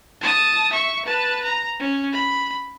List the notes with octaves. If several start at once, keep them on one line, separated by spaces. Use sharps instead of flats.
A5 D#6
E5 C#6
B4 A5
A#5
C#4
B5